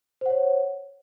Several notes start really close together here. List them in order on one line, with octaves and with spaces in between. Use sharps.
C5 F#5 C#5